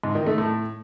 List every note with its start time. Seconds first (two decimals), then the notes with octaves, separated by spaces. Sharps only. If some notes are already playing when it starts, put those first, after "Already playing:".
0.04 G#2
0.15 D#3
0.27 A3
0.38 A2